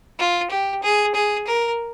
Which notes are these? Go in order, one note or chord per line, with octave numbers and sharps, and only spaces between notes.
F4
G4
G#4
G#4
A#4